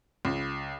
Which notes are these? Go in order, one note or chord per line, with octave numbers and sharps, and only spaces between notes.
C#2